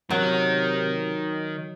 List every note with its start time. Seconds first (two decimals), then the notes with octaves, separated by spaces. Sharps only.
0.11 C3 D#3 F#3